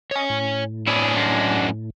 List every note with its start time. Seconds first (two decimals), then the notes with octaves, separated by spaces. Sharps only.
0.11 C#5 D#5 G#5
0.30 A2
0.87 D4 E4 G#4 C#5 D5
1.16 F#2 G#3